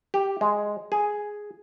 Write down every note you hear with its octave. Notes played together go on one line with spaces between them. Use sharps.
G4
G#3
G#4